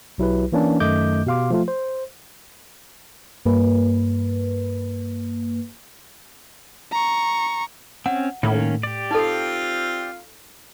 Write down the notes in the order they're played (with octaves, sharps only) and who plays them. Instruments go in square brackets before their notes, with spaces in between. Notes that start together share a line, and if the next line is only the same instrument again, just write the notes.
[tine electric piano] B1 F#3 E4 G4 B4
E3 A#3 C#4 D4
F#2 D#3 A3 D#5 D6 G6
B2 G4 F5 C6 D6
F3 A3 F4
C5
[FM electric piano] G2 A#3 B4
[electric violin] A#5 C#6
[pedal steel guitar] C4 C#4 [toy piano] F#5
[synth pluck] A2 [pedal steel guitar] D#3 A#3 C#4
[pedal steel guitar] G4 D5
[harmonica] C4 F4 F5 [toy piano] D#4 A4